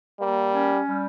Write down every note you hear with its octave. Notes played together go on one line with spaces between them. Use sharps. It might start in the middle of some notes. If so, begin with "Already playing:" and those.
G3 A#3
C#4
G3